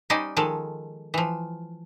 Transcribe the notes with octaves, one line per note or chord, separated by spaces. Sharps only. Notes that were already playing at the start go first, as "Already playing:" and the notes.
G3 C#4 D#4 C5 D5 D#5
D#3 F3 G#3 A4
E3 F3